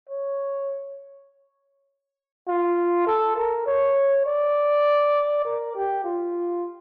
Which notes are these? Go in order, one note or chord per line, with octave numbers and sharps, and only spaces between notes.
C#5
F4
A4
A#4
C#5
D5
A#4
G4
F4